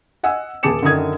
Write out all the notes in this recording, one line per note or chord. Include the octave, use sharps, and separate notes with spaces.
D#5 F#5 G#5 E6
D#1 G#4 A5 D6 C#7 E7
F#2 D3 D#3 A#4 D#6 G#6